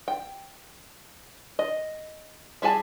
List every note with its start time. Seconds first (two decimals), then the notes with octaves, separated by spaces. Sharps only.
0.08 G5
1.59 D#5
2.62 G3 E4 G#4 G#5 A5